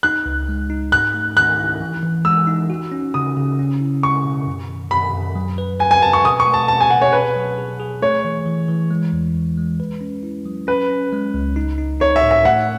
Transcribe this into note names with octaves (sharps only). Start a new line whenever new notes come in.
D#4 F#6
C#2
G#3
D#4
G#2 F#6
A3
D#3 F#6
E4
E3
E3
G#3 E6
D#4
F#4
C#4
C#3 D#6
C#3
C#4
E4
G#3 C#6
B2
F#2
D#3
F#2 B5
F#2
F#3
B4
B4 G#5
G#5
B4 A5
C#6
B2 D#6
C#6
A3
A5
B2 A5
G#5
B2 F#5
C#5
G#4 B4
F#3
G#4
G#4
A3 C#5
E3
E3
E3
G#3
E2
E2
G#3
B4
C#4
E4
F#3
C#4 B4
C#4
G#3
C#2
D#4
D#4
D#4 C#5
E5
A2
E5
A3 F#5